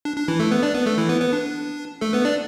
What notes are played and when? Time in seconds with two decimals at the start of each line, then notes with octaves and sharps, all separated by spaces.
0.05 D4
0.17 D4
0.28 E3 E4
0.40 A3 A4
0.51 B3 B4
0.62 D4 D5
0.74 B3 B4
0.86 A3 A4
0.98 E3 E4
1.09 B3 B4
1.21 B3 B4
1.33 D4
2.01 A3 A4
2.13 B3 B4
2.25 D4 D5